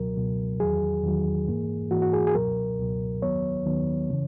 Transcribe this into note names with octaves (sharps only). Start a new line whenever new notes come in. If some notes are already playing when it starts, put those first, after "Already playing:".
Already playing: C#2 B2 F#3 A#4
C#2 B2 F#3
E2 D#3 F#3 G#4
E2 D#3 F#3
G#2 E3 A#3
G#2 E3 A#3 F#4
F#4
G#4
G#4
C#2 B2 F#3 A#4
C#2 B2 F#3
D#2 D#3 F#3 B3 C#5
D#2 D#3 F#3 B3
C#3 E3